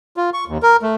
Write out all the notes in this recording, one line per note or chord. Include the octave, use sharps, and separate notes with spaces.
F4
C#6
D#2
A#4
A3